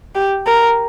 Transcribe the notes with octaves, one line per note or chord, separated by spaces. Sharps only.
G4
A#4